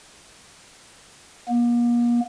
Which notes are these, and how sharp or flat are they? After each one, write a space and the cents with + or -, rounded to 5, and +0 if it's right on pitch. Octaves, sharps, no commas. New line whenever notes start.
A#3 +40